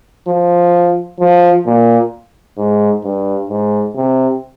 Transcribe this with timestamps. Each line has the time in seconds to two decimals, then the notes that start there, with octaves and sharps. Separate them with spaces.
0.28 F3
1.20 F3
1.66 A#2
2.58 G#2
3.04 G2
3.50 G#2
3.96 C3